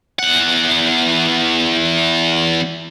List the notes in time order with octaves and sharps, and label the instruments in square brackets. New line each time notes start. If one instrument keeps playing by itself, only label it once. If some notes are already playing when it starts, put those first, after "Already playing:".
[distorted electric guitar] E2 F#5